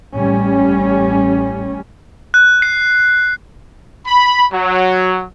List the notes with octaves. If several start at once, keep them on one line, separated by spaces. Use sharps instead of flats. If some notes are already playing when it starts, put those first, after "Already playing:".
A1 G3 C#4
F#6
C7
B5
F#3